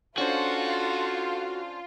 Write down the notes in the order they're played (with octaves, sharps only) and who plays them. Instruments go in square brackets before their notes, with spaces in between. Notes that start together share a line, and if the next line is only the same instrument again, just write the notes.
[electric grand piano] C#4 D4 C5 [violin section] F4 [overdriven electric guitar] F#4 [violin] A4